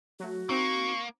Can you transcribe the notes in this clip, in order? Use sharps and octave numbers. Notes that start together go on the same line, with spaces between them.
F#3 A3 F#4
A#3 C4 D#4 C#6